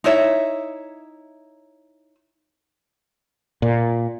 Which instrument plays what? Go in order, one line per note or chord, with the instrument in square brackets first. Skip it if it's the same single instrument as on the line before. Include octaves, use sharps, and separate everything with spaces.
[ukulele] D#4 E4 C#5 E5
[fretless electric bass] A#2